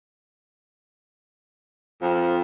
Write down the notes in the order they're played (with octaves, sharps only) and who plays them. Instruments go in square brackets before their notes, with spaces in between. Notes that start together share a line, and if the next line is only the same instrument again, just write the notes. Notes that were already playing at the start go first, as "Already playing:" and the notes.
[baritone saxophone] F2 [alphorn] F3